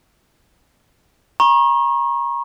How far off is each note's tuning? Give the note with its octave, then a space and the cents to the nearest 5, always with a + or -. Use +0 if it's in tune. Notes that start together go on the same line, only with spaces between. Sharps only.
A#5 +35 C#6 -30